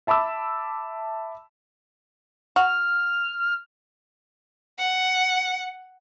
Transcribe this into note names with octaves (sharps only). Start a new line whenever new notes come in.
E5 A5 B5 D6 E6
F#4 F6
F#5